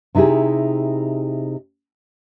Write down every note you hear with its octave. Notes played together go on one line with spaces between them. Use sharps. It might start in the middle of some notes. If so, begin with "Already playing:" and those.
C3 D#4 E4 G4 G#4